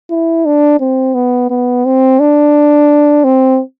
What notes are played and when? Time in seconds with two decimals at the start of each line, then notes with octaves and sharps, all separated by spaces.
0.10 E4
0.45 D4
0.80 C4
1.15 B3
1.50 B3
1.85 C4
2.20 D4
3.24 C4